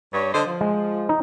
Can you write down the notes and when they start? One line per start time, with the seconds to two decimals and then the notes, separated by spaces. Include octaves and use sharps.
0.13 G2 C#5
0.33 D3 C5 D#5
0.46 F3
0.61 G#3
1.09 D#4